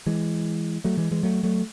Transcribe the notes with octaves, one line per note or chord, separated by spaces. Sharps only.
E3 G#3
F#3 A3
E3 G#3
E3 G#3
F#3 A3
F#3 A3